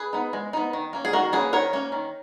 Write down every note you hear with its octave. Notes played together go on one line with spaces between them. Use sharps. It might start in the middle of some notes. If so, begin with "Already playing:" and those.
Already playing: G#4 B4
B3 D#4
G#3
B3 D#4
D#3
A#3 C#4
G#4
D#3 F#4 A#4
A#3 C#4 G#4 B4
D#3 A#4 C#5
A#3 C#4
D#3